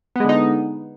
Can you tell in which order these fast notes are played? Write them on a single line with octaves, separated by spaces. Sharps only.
B3 G#3 D3 D#4